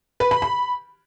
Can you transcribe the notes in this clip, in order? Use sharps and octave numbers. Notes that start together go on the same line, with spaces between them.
B4
B5
B5